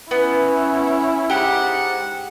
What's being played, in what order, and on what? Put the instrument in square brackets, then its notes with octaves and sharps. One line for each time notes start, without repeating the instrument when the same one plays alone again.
[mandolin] B3 [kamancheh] C#4 E4
[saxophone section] G#2 F#5 [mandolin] G4